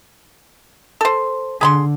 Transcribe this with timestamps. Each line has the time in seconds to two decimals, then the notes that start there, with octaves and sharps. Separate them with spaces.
1.01 A4 C5
1.61 D3 G#4 B5 C6